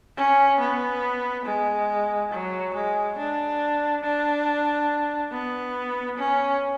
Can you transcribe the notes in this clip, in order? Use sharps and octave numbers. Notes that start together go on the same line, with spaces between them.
C#4
B3
G#3
F#3
G#3
D4
D4
B3
C#4